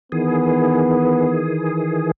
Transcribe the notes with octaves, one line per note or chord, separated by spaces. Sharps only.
D#3 E3 B3 G#4